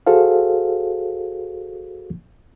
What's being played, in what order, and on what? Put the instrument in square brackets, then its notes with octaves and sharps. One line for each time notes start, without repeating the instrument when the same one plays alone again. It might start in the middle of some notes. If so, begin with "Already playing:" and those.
[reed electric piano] F#4 G#4 A4 C5 F5